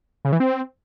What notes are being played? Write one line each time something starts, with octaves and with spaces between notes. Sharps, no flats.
C#3
E3
C4